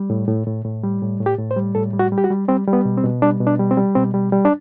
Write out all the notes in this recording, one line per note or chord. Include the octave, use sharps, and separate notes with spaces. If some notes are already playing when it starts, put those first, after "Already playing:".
Already playing: G3
A2
A2
A2
A2
G3
A2
A2
G4
A2
C5
G3
A2 A4
G3
F#4
G3
G4
F#4
G3
G3 C4
G3
B3
B2
C4
B2
G3 D4
B2
D4
G3
C4
G3
B2 C4
G3
G3
D4